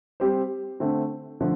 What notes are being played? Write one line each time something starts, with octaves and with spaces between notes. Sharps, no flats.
G3 C4 G4 C5
D3 A3 C4
D3 F3 A3